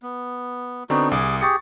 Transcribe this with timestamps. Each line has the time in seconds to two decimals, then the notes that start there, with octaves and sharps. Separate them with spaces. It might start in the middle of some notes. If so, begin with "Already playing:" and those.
0.03 B3
0.90 D3 B3 C4 D4 D#4 F#4
1.11 C2 G#4 D6
1.41 G4 G#4 C#6 A6 C#7